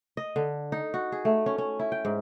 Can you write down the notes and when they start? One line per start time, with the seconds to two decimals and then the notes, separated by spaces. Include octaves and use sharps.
0.17 D#5
0.36 D3
0.72 D#4
0.94 F#4
1.12 G#4
1.25 A3
1.46 C#4
1.58 C#4
1.80 E4
1.92 G5
2.05 G#2